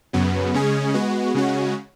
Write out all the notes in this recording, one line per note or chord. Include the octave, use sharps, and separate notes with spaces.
F#2 C#3 F#3 B3
C#3 G#3 C#4 G#4
G#3 B3 F#4
C#3 G#3 C#4 F#4